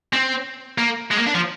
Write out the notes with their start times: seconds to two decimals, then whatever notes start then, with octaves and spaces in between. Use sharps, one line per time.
0.13 C4
0.78 A#3
1.11 G#3
1.18 A#3
1.26 D4
1.34 F3